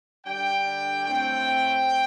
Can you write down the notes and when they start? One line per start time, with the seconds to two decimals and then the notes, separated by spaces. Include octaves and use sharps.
0.25 D3 G3 D4 G5
1.05 A2 A3 C4 G5